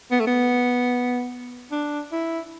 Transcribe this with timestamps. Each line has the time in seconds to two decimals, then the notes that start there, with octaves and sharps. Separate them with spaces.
0.11 B3
0.20 A3
0.27 B3
1.72 D4
2.12 E4